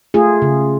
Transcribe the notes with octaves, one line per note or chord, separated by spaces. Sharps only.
A3 F4 G#4
C#3